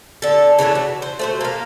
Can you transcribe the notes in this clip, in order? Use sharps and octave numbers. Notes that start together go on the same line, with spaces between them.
D3 A4
C#3 E3 A3 D4
F#4
C5
A3 F#4 C5
A#3 F5